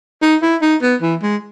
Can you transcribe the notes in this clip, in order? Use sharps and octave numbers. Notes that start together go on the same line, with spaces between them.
D#4
E4
D#4
B3
E3
G#3